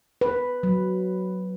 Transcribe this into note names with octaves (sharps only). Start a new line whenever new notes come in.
B4
F#3